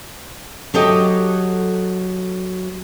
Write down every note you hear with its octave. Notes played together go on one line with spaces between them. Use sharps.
F#3 G4 A4 D#5